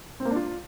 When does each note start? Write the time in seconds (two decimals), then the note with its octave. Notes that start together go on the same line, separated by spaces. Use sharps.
0.20 C4
0.25 A#3
0.31 D4
0.36 F4